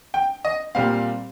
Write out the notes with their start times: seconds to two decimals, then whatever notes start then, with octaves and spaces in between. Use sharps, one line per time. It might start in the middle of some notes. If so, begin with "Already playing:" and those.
0.14 G5
0.44 D#5
0.75 A#2 G3 C4 F5